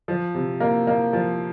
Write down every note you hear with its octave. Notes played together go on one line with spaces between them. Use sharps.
F3
C3
A#3
A#3
F3